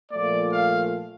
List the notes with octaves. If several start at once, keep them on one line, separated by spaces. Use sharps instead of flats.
A#2 F3 A3 D5
F5